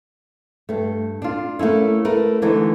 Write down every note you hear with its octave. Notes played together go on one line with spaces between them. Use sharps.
G2 A3
D4 F4
A3 A#3 C#4 E4
A3 A#4 B4
D3 E3 A3 D#4